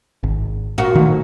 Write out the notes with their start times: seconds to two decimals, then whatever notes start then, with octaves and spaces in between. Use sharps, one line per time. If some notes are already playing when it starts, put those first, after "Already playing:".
0.23 G#1
0.78 A#2 F#4
0.95 D#3 A3